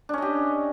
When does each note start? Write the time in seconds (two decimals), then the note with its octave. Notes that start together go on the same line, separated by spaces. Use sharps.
0.09 D4
0.13 C#4
0.18 D#5
0.22 G4